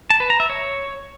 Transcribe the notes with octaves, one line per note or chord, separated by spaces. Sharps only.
A5
B4
A#5
E5
C#5